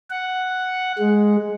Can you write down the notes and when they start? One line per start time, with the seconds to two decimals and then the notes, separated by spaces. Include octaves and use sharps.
0.10 F#5
0.98 G#3